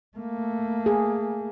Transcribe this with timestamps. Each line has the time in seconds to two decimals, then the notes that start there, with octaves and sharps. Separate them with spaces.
0.17 A3 A#3
0.86 G#4